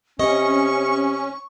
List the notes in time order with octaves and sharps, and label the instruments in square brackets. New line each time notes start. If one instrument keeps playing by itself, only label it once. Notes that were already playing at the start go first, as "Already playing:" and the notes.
[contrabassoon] C3 [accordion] C#4 [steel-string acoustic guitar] D#5 [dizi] C#6